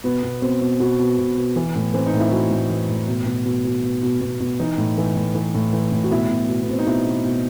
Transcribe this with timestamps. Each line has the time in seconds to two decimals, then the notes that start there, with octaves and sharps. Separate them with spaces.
0.04 B2 B3
0.23 B2
0.42 B2 C4
0.61 B2
0.80 B2 F#4
0.99 B2
1.18 B2
1.38 B2
1.56 E3
1.75 A2
1.94 E3 C4
2.07 D#4
2.13 A2
2.20 E4
2.32 E3 F#4
2.51 A2
2.70 E3
2.89 A2
3.08 B2
3.26 B2
3.45 B2
3.65 B2
3.83 B2
4.03 B2
4.21 B2
4.40 B2
4.60 E3 D#4
4.78 A2
4.98 E3
5.16 A2
5.35 E3
5.54 A2
5.73 E3
5.92 A2
6.04 F#4
6.11 B2 E4
6.30 B2
6.48 B2
6.61 B3
6.68 B2 C4
6.79 D#4
6.86 B2 E4
7.05 B2
7.25 B2